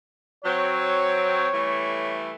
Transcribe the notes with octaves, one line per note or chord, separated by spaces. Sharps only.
F#3 C4 C#5
E3 G3 A3